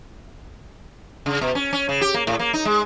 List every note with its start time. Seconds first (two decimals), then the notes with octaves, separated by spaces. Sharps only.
1.26 C#3
1.41 B2
1.55 C#4
1.73 C#4
1.89 C#3
2.01 G4
2.14 A#3
2.27 A2
2.39 A#3
2.53 D#4
2.65 G#3